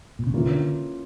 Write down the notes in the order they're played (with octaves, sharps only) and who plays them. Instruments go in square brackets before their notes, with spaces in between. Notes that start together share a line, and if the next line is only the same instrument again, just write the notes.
[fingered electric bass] A#2
C#3
[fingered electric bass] D3 [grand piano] E3 A#3 C#4 F4
[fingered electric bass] C#3
D3